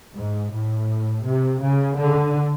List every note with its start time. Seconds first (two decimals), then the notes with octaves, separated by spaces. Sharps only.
0.14 G#2
0.51 A2
1.24 C3
1.61 C#3
1.97 D3